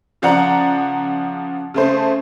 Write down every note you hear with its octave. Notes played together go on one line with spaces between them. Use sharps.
C#3 F3 D5 F#5 A#5
C#3 A3 C5